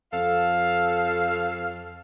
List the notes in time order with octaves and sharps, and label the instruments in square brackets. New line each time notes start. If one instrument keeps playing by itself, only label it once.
[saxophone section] F2 A4 F5